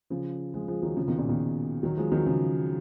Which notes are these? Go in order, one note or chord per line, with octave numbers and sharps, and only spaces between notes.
C#3 F3
F3 G#3
F3 G#3
D#3 F#3
C#3 F3
B2 D#3
A#2 C#3
B2 D#3
D#3 F#3
F3 G#3
D#3 F#3
C#3 F3